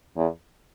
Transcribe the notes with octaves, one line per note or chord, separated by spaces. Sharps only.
E2